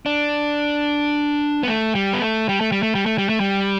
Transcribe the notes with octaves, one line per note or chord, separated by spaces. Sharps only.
D4
B3
A3
G3
B3
A3
G3
A3
G3
A3
G3
A3
G3
A3
G3